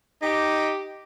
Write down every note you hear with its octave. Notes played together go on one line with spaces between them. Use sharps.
D#4 G4